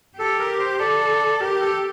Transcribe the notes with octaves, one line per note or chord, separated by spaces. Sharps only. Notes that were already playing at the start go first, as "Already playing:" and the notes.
G4 A4
A#4
C5
A4 D5
G4 A#4
A4